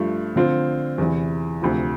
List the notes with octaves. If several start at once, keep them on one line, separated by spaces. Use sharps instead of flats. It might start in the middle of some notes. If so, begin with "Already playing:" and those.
Already playing: G2 F3 A3
D3 F3 C4 F4
E2 C3 E3
D2 C3 F3